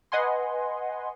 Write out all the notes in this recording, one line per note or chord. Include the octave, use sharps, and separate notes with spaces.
B4 D#5 F#5 G#5 C6